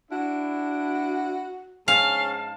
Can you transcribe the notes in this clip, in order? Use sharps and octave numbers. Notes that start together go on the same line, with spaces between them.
D4 E4 F#4
G#2 C#4 F5 A5